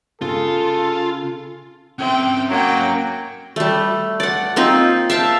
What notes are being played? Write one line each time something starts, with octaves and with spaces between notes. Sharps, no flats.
C#3 F4 A4
C4 C#4 E5 G5
F#3 A#3 G5
G3 A3
D5 F#5
A#3 C4 D#4 F4
E5 F5 G5 A5